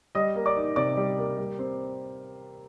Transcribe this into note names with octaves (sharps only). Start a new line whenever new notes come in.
G3 D#5 D#6
A#3
D5 D6
D#4
C3 D5 D6
G3
A#3
G3
C4